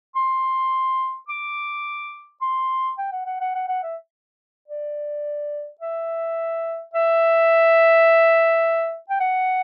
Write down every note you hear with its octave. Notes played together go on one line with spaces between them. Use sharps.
C6
D6
C6
G5
F#5
F#5
F#5
F#5
F#5
E5
D5
E5
E5
G5
F#5